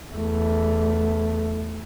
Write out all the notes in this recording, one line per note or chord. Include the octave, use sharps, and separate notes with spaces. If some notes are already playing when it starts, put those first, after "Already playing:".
E2 A3